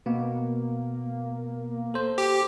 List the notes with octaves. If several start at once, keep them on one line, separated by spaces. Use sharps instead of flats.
B2 A#3 B3
A4 C5
G4